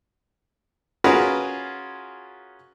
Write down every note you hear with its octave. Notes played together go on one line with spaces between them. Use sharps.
C#4 F4 F#4 G#4 A#4 B4